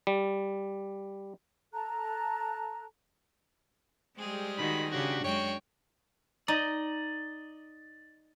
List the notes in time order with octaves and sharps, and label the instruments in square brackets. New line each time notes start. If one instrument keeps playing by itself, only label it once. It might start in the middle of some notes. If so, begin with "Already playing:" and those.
[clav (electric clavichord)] G3
[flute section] A4 A5 A#5 F#6
[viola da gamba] G3 G#3 [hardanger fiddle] C4 G#4
[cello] D#3 F#4 [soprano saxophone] B5
[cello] C#3 G4 [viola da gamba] D4 [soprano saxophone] F#4
[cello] F#2 G#3 [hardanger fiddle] F#4 G5 [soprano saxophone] C#5
[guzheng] D#4 [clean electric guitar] D5 D#5